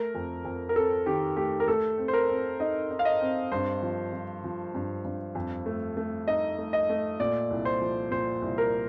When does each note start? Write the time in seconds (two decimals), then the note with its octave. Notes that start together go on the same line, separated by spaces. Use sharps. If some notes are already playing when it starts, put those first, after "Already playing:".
Already playing: A3 A#4
0.15 F2
0.45 F2
0.69 A#4
0.76 C4 A4
1.06 D#3 G4
1.37 A3 G4
1.60 A#4
1.68 A3 A4
1.98 C4
2.08 C5
2.13 A#4
2.29 C4
2.60 D#4 D#5
2.91 D#4
2.99 F5
3.05 D#5
3.21 C4
3.52 G2 C5
3.82 F3
4.13 F3
4.44 F3
4.75 G2
5.05 G2
5.35 F2
5.66 A3
5.97 A3
6.28 D#4 D#5
6.58 A3
6.73 D#5
6.89 A3
7.20 A#2 D5
7.51 C2
7.65 C5
7.82 F3
8.11 A#2 C5
8.42 C2
8.58 A#4